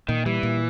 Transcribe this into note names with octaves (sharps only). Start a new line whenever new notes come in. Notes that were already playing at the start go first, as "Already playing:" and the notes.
A#2 D#3
E3 G3
A#2